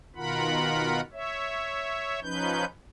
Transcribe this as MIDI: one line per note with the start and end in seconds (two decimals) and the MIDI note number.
0.16 1.01 47
0.16 1.01 51
0.16 1.01 65
0.16 1.01 70
0.16 1.01 78
0.16 1.01 83
1.13 2.20 73
1.13 2.20 76
2.23 2.65 53
2.23 2.65 61
2.23 2.65 63
2.23 2.65 71
2.23 2.65 91